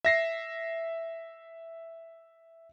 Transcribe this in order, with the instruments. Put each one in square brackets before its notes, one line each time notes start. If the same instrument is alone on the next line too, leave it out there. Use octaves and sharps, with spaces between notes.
[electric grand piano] E5 A#6 C7